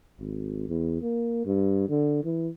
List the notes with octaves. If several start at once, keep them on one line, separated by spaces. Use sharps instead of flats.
G#1
E2
A#3
G2
D3
E3